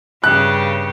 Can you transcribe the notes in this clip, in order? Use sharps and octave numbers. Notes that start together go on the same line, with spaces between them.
G2 C#3 G4 F#6